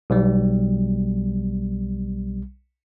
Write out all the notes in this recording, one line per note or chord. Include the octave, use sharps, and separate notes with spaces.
B1 G3